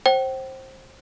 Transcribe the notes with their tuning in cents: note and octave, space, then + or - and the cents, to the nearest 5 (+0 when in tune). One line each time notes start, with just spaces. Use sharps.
C5 +20 G5 -35